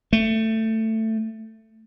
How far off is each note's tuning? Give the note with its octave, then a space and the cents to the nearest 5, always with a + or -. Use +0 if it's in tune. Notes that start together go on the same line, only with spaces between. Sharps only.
A3 +15